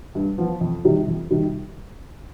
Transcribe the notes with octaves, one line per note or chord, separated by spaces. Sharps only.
G2
F3 B3 F4
F2
C3 D#3 G3
F2
C3 D#3 G3